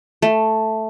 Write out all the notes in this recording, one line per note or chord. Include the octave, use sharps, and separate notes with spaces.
A3